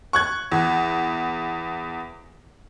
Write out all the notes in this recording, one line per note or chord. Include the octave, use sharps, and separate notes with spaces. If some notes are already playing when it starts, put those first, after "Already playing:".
C#6 F#6 G#6
E2